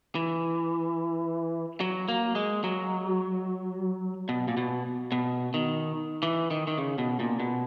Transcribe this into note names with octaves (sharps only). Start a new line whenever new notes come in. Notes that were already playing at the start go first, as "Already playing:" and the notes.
E3
F#3
A#3
G#3
F#3
B2
A#2
B2
B2
D#3
E3
D#3
D#3
C#3
B2
A#2
B2